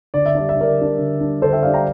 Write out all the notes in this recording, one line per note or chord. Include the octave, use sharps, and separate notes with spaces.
D3 D5
E5
G3 D4 D5
E5
D3 A#4 D5
G3 D4
D3
G3 D4
D3 A4 C5
E5 G5
G3 D4 D5 F5
G5 A#5